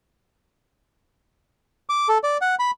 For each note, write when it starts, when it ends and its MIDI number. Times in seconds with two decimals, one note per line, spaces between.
1.89 2.08 86
2.09 2.18 69
2.24 2.37 74
2.41 2.55 78
2.59 2.71 83